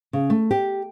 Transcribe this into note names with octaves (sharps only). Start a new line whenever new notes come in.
C#3
A3
G4